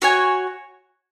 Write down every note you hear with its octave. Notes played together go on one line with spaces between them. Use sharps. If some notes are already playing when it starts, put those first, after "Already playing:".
F#4 C#5 G#5